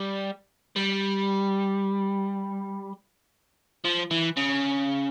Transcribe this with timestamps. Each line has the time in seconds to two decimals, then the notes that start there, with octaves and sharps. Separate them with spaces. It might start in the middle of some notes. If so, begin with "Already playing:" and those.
Already playing: G3
0.76 G3
3.85 F3
4.11 E3
4.37 C#3